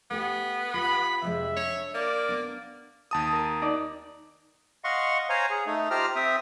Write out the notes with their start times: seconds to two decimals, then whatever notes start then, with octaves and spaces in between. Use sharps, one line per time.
0.11 A3 B3 G4
0.74 F4 G4 B5
1.22 F2 C3 G#3 E5
1.57 D4 C#5
1.95 A#3 D5
2.29 B3 D4
3.11 D#2 A5 D#6
3.33 A#4
3.62 D#4 D5
4.84 D#5 F5 F#5 C6 C#6
5.29 C5 C#5 F5 G#5 A#5
5.50 G#4
5.66 A3 D#4
5.91 F4 G4 C5 G5 A#5 F6
6.16 C4 E5 G5 D#6